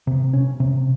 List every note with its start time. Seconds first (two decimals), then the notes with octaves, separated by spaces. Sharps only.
0.07 C3
0.33 C#4
0.60 C3